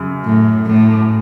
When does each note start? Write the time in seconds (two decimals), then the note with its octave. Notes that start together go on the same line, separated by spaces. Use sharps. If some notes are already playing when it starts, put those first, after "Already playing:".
Already playing: F#2 C#3
0.24 A2
0.66 A2